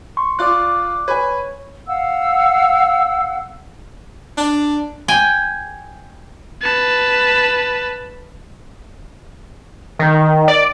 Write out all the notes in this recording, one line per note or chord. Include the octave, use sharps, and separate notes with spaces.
C6 C#6
F4 D5 D6 F#6
B4 C#5 G#5
F5 F#5 E6
D4
G5 G#5
B4 A5
D#3
D5